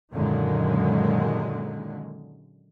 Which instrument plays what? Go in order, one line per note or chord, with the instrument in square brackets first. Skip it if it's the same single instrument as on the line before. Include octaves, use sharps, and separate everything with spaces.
[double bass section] F#2 A#2 D3 D#3 G#3